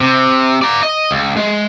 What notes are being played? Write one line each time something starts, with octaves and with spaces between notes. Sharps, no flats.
C3
D5 A#5
D#5
C#2
G#3